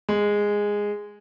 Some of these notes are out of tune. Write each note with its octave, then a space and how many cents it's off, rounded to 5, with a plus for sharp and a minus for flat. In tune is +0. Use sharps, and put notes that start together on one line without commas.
G#3 -10